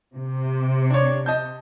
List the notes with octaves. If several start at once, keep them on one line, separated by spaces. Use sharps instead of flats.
C3
D4 C#5
D#5 A5 G6